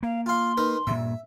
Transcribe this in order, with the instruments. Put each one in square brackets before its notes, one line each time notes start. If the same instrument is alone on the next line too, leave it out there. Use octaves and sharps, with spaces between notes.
[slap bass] A#3 [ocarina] F5
[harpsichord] F4 F5 [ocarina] C6
[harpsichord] D#4 A#4 B4
[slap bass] G2 A#2 [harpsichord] E5